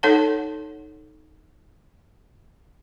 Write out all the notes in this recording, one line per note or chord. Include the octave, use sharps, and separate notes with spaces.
D#4 A4 C#5 F#5 A5